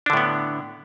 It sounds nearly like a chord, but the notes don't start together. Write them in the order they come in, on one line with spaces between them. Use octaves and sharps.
D4 D3 A2 B3